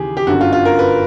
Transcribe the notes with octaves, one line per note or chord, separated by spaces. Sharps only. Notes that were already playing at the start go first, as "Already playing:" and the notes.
Already playing: D#2 C#3 E3 G4 G#4
G4
G1 F#2 D3 F#4
F4
F4
A#4
B4